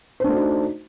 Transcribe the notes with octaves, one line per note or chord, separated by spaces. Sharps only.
A3 D4 D#4 F#4 C5